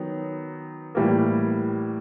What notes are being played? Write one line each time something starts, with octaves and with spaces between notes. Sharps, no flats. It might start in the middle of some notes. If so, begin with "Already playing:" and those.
Already playing: D#3 F#3 B3 D#4
A2 E3 G3 A#3